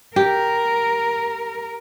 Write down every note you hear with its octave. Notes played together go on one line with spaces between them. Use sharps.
G4 A#4